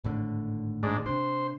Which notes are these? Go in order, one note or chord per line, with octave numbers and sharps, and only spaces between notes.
G#1 A2 D3
G#2 D4
C3 D4 C5